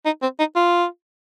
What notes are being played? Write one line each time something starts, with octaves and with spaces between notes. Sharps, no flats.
D#4
C4
D#4
F4